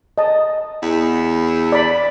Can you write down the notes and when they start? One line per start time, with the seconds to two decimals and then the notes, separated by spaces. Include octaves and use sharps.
0.18 D#5 A5
0.82 E2
1.72 D5 B5